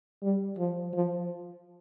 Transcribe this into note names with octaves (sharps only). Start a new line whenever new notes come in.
G3
F3
F3